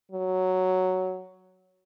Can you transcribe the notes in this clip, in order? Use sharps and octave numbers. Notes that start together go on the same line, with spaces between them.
F#3